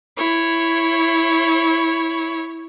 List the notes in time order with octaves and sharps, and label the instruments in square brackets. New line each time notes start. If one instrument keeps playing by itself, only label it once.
[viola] E4 C#5